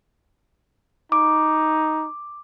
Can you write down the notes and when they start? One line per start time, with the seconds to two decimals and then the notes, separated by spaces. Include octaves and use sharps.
1.12 D#4 D6